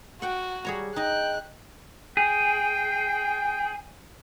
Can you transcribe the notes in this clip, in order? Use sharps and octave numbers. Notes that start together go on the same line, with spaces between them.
F#4 F#5 G5
G3 G#4 C#5 A#5
D#4 D#5 G5 F#6
G#4 G5